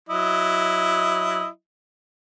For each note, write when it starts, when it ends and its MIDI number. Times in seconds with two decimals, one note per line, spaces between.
0.09 1.47 54
0.09 1.47 64
0.09 1.47 75